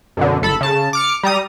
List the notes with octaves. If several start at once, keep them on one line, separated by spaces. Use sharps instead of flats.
F#2 B2 D3
G1 A4 B5
C#3 A5
D6 F6 C#7
G3 A#5 D#6